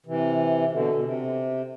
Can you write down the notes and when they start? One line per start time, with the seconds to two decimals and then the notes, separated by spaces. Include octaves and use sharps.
0.06 C3 E3
0.71 B2 D3
0.95 B2
1.03 C3